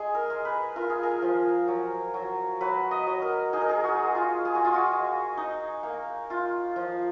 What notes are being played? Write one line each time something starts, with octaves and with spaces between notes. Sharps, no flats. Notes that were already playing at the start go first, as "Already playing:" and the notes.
Already playing: G#3 G#4
A#4
G#3
B4
F4 A#4
G#4
A#4
F3
F#3
F#3
F#3 B4
D#5
F#3
A#4
D#4 G#4
A#4
G#4
F#4
G#3
F4
G#3 G#4
F#4
F4
F#4
G#3
D#4
A#3
F4
F3